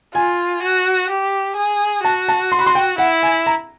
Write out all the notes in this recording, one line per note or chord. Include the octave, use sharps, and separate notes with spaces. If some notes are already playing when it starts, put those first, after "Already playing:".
F4 G#5
F#4
G4
G#4
F#4 A5
A5
C6
B5
C6
G5
E4 F#5
G#5
A#5